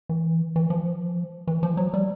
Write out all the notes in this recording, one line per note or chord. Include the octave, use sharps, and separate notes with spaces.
E3
E3
F3
E3
F3
F#3
G3